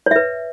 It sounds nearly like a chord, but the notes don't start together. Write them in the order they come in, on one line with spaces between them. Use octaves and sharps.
C#5 E5 B4